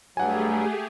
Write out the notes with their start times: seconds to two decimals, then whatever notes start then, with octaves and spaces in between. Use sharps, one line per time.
0.17 G2 F#3 G3 A3 G4 G#4 F#5 G#5